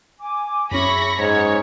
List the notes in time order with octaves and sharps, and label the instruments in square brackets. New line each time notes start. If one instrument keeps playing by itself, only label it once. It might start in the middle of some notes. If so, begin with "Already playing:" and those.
[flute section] G#5 D6
[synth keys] F#2 C#4 [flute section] E4 G#4 C#5 [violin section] B5 C#6 A#6
[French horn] G#2 [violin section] C#5 [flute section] A#5 G#6